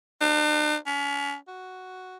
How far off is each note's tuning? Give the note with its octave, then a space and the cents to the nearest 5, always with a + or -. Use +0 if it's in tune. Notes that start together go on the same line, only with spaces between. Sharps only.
D4 +45
C#4 +35
F#4 +5